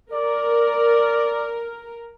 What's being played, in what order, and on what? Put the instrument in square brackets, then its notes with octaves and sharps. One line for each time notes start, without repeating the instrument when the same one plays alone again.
[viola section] A#4 [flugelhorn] D5